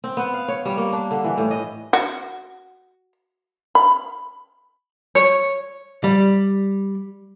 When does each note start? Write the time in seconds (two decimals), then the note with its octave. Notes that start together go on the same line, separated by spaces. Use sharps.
0.04 C4
0.17 B3
0.34 F5
0.48 C#5
0.65 G3
0.77 A#3
0.92 D4
1.11 D3
1.24 E3
1.38 A2
1.51 D#5
1.93 F#4
3.75 B5
5.15 C#5
6.04 G3